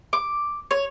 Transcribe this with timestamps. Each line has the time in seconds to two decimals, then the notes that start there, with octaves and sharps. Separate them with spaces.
0.13 D6
0.71 C#5